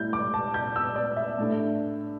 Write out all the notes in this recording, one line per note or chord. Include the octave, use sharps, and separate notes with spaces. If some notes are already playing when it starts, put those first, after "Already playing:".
Already playing: A2 G3 E4 G6
D6
A5
G6
E6
D5
E5
A2 A3 D4